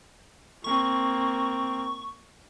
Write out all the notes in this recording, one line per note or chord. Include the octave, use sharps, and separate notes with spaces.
A#3 C4 C#6